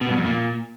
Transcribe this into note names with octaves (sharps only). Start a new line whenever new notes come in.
B2
G2
F2
A#2